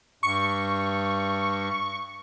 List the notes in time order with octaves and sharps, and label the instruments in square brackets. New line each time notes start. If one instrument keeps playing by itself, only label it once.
[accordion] G2 [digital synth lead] C#6